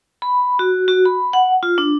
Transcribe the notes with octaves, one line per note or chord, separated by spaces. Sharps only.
B5
F#4
F#4
B5
F#5
F4
D4